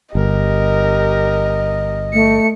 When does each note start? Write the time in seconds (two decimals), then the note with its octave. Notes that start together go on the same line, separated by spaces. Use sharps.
0.15 G1 G4 A#4 D#5
2.13 A3 C#7